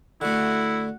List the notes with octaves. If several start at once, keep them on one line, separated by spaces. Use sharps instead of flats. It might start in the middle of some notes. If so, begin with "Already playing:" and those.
D3 A3 E4 F#4 F#5